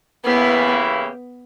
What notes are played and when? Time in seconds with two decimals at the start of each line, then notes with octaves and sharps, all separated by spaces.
0.25 C#3 E3 A#3 B3 E4 G4